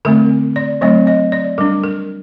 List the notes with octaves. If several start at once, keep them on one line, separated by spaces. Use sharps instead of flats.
D3 A3 C4 A#4
D5
F#3 A3 C4 D#5
D#5
D5
G3 D4 A#4
A#4